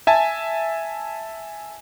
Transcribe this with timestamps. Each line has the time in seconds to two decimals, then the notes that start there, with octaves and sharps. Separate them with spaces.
0.07 E5 G#5 A5